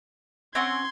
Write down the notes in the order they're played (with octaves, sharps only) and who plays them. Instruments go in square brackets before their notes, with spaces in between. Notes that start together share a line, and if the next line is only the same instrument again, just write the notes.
[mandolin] C4 C#4 F#5 [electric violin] C6 G#6